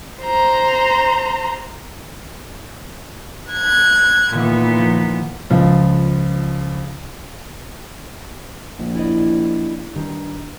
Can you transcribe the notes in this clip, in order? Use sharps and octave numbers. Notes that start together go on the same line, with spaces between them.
C5 A#5
F#6 G#6
A#2 D#3 E3 B3
F3
C#2 F3
A#1
E4 D5 D#5
G2 D#3